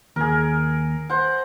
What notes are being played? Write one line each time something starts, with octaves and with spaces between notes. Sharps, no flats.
D#2 G#4 A#4
C5 F#5